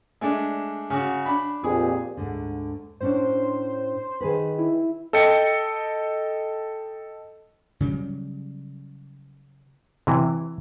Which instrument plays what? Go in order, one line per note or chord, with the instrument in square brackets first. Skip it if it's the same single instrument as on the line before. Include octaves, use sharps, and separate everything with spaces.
[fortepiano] G#3 A3 D4
C#3 F#4
D4 B5
[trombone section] F2 A#2 G4 [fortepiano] G#4
[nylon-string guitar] D2 G#2 D3
[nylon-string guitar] A2 C#4 D4 [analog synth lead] C5
[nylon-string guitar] D#3 G#4 B4
[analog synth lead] E4
[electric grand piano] A4 D#5 G5 C#7
[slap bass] C#3 F#3 G3
[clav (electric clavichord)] C3 E3